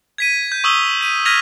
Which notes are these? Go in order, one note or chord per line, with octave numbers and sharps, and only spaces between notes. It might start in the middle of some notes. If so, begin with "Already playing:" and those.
G#6 B6 D#7
G6
C#6 D#6 E6 F7 G7
B6 D#7
F6 G#6 A#6 B6 D#7 F7